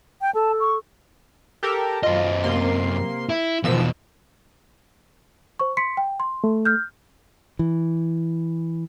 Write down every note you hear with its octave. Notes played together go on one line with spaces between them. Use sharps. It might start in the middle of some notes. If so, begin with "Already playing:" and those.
G5
A4 A5
C#6
G4 A4 A#4
F#2 F4 D#5
C3 A#3 C6
E4
E2 B2 D#3 F3 E6
C5 C#6
C6 B6 C#7
G5
C6
A3
F6 G6
E3